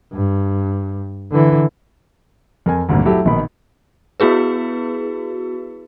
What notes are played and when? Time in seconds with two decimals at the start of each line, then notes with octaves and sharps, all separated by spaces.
0.13 G2
1.31 D3 E3
2.66 F2 A#4 G#5
2.89 G#1 D2 G2 A#2
3.05 F#3 A3 E4 G4 A4
3.25 A#1 B2 D#3 B5
4.20 B3 E4 F#4 G#4 B4